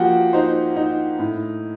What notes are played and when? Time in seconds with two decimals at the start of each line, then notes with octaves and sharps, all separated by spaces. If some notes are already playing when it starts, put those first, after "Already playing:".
Already playing: F3 A#3 F#4 G4 F#5 G5
0.33 D#4 C5
0.76 D#4
1.19 A2